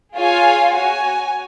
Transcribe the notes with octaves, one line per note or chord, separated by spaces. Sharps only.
F4 G#4 C#5 F5 G#5
F#4 C#5 G#5